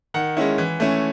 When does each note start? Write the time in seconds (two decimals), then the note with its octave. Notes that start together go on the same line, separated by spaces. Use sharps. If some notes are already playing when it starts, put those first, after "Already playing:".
0.14 D#3 F#5
0.37 G#3 C#4 E4
0.58 E3
0.80 A3 C#4 E4